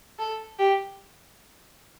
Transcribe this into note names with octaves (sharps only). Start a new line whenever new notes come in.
A4
G4